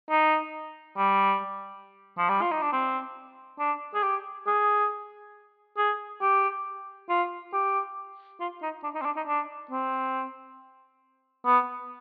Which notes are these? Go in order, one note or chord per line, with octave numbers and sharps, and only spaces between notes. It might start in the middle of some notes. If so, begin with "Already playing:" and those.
D#4
G3
F3
G3
F4
D#4
D4
C4
D4
G#4
G4
G#4
G#4
G4
F4
G4
F4
D#4
D4
D#4
C4
D4
D#4
D4
C4
B3